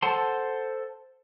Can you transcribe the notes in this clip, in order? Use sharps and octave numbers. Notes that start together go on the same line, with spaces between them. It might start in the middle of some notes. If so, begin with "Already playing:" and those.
A4 C5 F#5 A5 C6